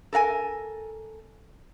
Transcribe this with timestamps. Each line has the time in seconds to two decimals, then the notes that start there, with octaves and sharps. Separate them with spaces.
0.13 A4 A#4 F5 G#5